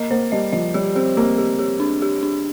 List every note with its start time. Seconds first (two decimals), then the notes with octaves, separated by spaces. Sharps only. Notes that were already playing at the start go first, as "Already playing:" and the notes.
Already playing: A#3 D#5
0.10 A#3 C5
0.32 G3 D#5
0.52 F3 D#5
0.74 G3 G4
0.95 C4 G4
1.17 A#3 G4
1.38 G4
1.59 G4
1.80 D4
2.02 G4
2.23 D4